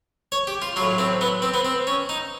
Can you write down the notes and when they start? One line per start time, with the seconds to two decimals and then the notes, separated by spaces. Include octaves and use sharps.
0.32 C#5
0.47 G4
0.62 F4
0.76 F#3 F4
0.81 A2
0.98 C4
1.21 B3
1.42 C4
1.54 B3
1.65 C4
1.87 C#4
2.09 D#4